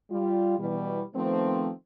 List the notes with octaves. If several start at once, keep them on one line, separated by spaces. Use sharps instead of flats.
G3 F4
B2 E3 G3
D#3 F3 A3 B3 C4